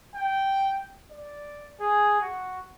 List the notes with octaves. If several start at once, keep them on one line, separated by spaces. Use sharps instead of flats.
G5
D5
G#4
F#4